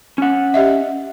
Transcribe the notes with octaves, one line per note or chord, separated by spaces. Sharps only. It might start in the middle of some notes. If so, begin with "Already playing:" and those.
C#4 F#5
G4 D#5 E5